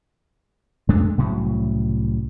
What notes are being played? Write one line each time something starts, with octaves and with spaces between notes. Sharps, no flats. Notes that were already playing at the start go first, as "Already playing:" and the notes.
F2 G#3 A3 D4
C2 A2 C#3 F#3